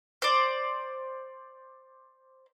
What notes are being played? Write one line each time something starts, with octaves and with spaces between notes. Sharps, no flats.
C5 D5